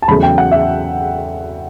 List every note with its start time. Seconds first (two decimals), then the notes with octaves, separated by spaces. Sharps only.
0.02 A5
0.08 E2 C#3 F#3 A3 B5
0.23 G5
0.38 F#5
0.51 E5